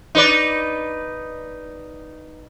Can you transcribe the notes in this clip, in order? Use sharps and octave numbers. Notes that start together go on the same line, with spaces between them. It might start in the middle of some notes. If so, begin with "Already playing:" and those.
D#4 B4 D5